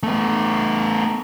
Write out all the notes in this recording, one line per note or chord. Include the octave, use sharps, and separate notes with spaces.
A3 B3